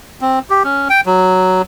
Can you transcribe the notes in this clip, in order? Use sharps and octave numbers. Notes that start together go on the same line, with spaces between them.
C4
G4
C#4
G5
F#3